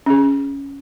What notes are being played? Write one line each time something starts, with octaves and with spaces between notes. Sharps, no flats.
C#4 G#4